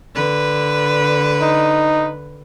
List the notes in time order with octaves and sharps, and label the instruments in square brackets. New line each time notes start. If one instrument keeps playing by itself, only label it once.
[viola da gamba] D3 B4
[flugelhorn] D#4